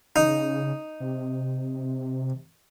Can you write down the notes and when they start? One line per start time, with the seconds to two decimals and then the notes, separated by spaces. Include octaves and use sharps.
0.16 C#3 D#4
1.00 C3